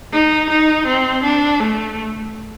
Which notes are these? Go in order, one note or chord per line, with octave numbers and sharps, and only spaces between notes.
D#4
D#4
C4
D4
A3